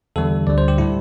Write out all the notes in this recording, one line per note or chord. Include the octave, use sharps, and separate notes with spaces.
E2 D3 G3 A4
D2 D3 G3 D5
C5
G4
A2 G3 E4